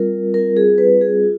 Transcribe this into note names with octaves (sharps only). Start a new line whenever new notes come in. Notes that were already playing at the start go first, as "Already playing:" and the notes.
Already playing: G3 C4 F4 A#4
G3 C4 F4 A#4
G#4
B4
G#4
F4